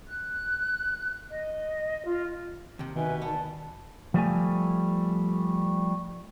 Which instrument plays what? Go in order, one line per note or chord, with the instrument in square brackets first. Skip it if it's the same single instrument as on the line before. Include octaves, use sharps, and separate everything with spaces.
[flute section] F#6
D#5
F4
[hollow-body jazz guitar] D#2 C3
[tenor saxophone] B2 [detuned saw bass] D#3 [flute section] B4 E5 G#5
[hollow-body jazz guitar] B3 [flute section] D5 A5
[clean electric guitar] F3 G3 A3 G#5